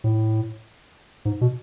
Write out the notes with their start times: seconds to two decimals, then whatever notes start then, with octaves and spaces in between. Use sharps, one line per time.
0.04 A2
1.25 G#2
1.41 B2